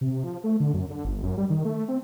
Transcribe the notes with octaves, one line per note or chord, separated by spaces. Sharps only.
C3
F3
A3
D3
F#2
D3
G1
F#2
G3
D#3
A3
C4